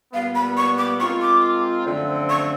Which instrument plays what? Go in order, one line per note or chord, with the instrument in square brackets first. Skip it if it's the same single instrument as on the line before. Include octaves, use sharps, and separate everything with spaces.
[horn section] A#2 G3 B3 [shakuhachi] F5
[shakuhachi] B5
C#6
D6
[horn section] G#3 C4 F4 A#4 [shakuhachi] C#6
[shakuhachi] D6
[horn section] F#2 D3 F3 A3 C4
[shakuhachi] C#6